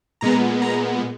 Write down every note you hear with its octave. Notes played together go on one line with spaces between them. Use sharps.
A#2 G#3 B3 A#5
A#5